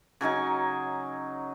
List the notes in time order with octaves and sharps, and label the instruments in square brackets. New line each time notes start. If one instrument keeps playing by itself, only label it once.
[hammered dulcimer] C#3 F#3 D#4 G#5